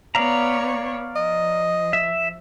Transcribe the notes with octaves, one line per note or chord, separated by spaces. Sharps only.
B3 C#5 D5 F5 A#5
F3 D#5
E5